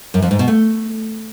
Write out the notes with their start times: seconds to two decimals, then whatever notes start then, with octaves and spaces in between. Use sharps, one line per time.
0.14 F#2
0.22 F2
0.31 G#2
0.39 B2
0.48 A3